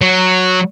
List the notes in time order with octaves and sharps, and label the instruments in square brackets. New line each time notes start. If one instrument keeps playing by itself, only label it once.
[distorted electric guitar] F#3